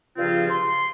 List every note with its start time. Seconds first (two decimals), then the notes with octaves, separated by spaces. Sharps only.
0.17 G2 C#3 F3 C4 F4
0.50 C6